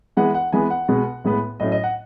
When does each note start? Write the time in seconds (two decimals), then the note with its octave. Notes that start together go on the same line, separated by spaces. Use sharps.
0.17 E3 G#3 B3 F#5
0.34 F#5
0.52 E3 G#3 B3 G#5
0.70 F#5
0.88 B2 G#3 B3
1.24 A2 G#3 B3
1.60 A2 F#3 A3 C#4 D#5
1.72 D#5
1.84 F#5